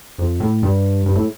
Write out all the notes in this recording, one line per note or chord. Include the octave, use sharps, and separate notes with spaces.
F2
A2
G2
G2
A2